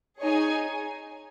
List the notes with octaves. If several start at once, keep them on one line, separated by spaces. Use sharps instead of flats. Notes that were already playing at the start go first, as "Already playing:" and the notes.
D#4 G#4 C#5 G#5